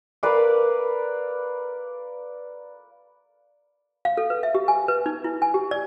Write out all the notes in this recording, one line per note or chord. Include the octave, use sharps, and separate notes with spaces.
A#4 B4 D5 F5
F5
A4
B4
E5
G4
G#5
B4
D#4
E4
G#5
G4
D5